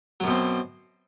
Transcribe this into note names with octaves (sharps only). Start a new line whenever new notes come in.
F#2 B2 F#3 C4